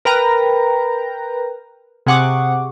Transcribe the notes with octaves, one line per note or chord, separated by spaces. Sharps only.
A#4 B4 G5 A#5
C3 G#4 F#5 C#6 D6